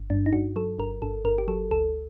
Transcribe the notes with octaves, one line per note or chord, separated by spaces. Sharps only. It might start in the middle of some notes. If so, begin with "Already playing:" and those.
Already playing: G1
G2 D4
D#4
G2 F#4
F#3 A4
G1 A#4
G1 A4
G1 A#4
G4
F#3 A4
D2 A4